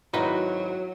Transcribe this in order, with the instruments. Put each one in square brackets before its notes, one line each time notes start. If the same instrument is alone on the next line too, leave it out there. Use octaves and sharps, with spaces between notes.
[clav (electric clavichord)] G#1 D#4 B4 [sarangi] F#3 [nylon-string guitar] E4 F#4